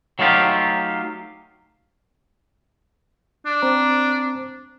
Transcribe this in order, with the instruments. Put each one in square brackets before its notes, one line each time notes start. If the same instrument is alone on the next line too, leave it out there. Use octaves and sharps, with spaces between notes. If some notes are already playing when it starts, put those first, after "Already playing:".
[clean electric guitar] F#3 A3 D#4 F4 G4
[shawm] D4
[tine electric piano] C4 C5 A#5